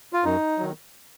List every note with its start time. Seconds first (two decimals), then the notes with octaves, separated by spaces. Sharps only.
0.13 F4
0.24 F#2 D#4
0.58 D#3 F#3